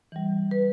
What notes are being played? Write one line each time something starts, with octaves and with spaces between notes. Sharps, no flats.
E3 G3
B4